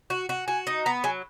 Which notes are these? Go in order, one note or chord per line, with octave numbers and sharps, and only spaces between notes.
F#4
F#4
F#4 G#5
D#4
B3 A#5
F#3 G#5